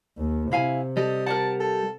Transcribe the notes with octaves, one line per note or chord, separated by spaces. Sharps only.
D#2
C3 E4 F5 G#5
G3 A4 D#5
A#4 D5 F#5 A5
A4